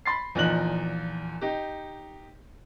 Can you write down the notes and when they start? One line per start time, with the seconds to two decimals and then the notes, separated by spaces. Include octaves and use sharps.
0.06 B5 C6 A6 C7
0.35 E2 A#2 F3 D#4 F#6 F#7
1.41 D#4 G4